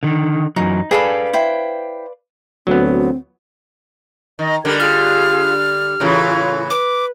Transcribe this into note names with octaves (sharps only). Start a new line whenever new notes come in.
D3 D#3
F#2 E3 F#3 D#4
G#4 A4 B4 D5 F5 B5
E4 C5 G5
D2 F#3 B3 C4
D#3 D#5
D3 G3 G4 A#4 G#6
F4 G#4 F6
A2 C#3 E3 F4 E6
B4 D6